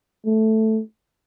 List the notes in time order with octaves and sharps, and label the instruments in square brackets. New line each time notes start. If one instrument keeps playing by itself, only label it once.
[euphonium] A3